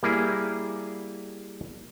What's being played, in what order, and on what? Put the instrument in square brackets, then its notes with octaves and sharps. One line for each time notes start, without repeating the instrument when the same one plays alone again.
[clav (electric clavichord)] G3 A#3 E4 G#4